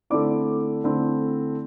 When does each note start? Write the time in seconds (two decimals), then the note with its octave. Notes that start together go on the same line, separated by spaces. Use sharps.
0.10 D3 A3 C4 E4 D5 D6
0.84 D3 A3 C4 E4